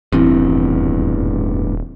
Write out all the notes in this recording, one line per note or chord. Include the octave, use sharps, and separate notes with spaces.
D#1 A1 E2 G2 C4 E4